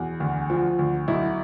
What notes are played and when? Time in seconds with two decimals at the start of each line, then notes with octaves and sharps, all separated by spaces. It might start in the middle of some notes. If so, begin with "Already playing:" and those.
Already playing: E2 B2
0.20 D2
0.50 F3
0.79 D2
1.08 B1 E4